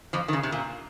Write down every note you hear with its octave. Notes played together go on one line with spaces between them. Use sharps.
F2 F3
D#3
C#3
C3
A#2